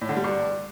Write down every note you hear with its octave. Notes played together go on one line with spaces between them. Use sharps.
A2
D3
G3
G2